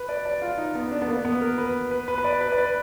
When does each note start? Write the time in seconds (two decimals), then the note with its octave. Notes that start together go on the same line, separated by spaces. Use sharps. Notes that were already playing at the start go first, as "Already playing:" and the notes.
Already playing: B4
0.09 D5
0.25 D5
0.42 F4
0.58 D#4
0.75 B3
0.91 D4
1.02 B3
1.08 A#3
1.25 B3
1.41 A#4
1.58 B4
1.91 B4
2.08 B4
2.18 B4
2.24 D5
2.41 B4
2.52 D5
2.58 B4